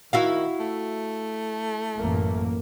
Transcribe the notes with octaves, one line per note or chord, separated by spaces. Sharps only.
D#3 E4 F#4 F5
A3
A1 F#2 A#3